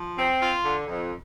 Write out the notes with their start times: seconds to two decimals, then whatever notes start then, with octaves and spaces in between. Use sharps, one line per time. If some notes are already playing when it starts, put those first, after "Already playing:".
Already playing: F3
0.17 C4
0.40 F4
0.64 D3
0.87 F2